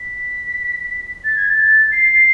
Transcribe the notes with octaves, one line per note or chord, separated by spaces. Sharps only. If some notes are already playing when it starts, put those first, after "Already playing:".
Already playing: B6
A6
G#6
A6
C7